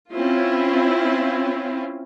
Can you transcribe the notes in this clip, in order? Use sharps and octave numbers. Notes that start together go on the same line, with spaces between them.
C4 C#4 E4 F4